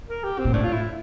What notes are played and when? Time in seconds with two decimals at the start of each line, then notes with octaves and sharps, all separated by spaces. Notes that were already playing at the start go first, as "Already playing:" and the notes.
0.08 A#4
0.24 G4
0.39 C4
0.45 A#2
0.53 A2 D4
0.64 F4
0.73 E4